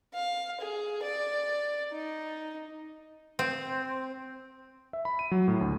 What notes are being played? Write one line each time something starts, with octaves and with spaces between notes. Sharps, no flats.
F5
G#4
D5
D#4
C4
E5
B5
D#7
F#3
A2
D2